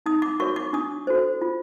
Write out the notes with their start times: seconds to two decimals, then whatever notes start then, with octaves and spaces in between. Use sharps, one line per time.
0.06 D#4 D#6
0.22 D6
0.40 F#4 A#4 C#5 C#6
0.56 D6
0.73 D4 D#6
1.07 F#4 A4 C5
1.42 F4